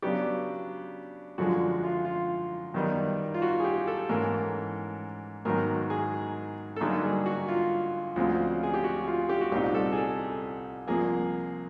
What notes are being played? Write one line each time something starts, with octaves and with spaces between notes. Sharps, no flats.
C#3 F#3 B3 D4 G4
F#2 D3 F3 G#3 F#4
F4
F4
F#2 D#3 G3 B3 D#4
F4
F#4
G#4
G4
A4
G#2 E3 A3 C#4 A#4
G#2 D#3 F#3 B3 D#4 A#4
G#4
A4
G2 D3 F#3 A#3 D#4 G#4
G#4
F#4
F4
D2 C#3 F3 G#3 C4
G#4
G4
F#4
F4
G4
F#4
C2 A#2 G3 C4 D#4 G4
A4
G#4
A4
C2 C3 F3 A#3 G#4